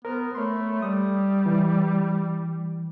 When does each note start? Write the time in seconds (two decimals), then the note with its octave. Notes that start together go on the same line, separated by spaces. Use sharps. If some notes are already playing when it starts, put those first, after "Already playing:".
0.05 B3 A#4 C5 F6
0.35 A3 C#5 B5 C6
0.82 G3 D#6
1.46 E3